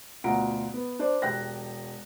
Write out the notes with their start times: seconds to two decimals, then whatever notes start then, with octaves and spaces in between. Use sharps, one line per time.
0.24 D2 B2 F4 F#5 A#5 D7
0.74 B3
0.99 D4 C5 D5
1.22 E1 G4 G5 F#6 A#6